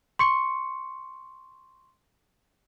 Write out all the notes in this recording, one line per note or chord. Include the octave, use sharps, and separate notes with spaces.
C6 C#6 C#7